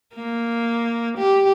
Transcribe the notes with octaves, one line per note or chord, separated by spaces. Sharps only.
A#3
G4